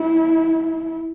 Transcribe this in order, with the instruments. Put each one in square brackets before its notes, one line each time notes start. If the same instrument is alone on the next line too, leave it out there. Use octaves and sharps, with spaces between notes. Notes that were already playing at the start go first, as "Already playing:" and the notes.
Already playing: [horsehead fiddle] E4